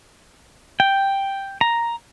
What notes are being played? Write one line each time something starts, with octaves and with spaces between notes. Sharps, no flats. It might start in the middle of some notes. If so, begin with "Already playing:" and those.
G5
A#5